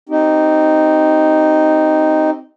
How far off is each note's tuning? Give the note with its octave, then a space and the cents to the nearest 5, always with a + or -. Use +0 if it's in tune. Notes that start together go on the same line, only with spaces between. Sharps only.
C4 +0 D#4 +0 G4 -25